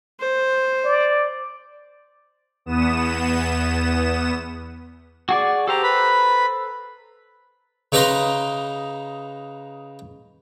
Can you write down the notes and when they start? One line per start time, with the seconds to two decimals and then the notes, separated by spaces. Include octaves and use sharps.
0.20 C5
0.85 D5
2.66 E2 B3 D#6 E7
5.29 F#4 G#4 D5
5.68 G4 A4 C5 A#5
5.83 B4 B5
7.92 C#3 D#4 B4 D#5 A#5 C6